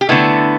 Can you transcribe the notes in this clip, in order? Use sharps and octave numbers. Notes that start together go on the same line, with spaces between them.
G4
D3 A3 B3 E4